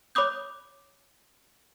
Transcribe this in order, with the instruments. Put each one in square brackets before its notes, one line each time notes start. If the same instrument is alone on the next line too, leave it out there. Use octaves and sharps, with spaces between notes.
[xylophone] C#5 B5 D6 D#6 G6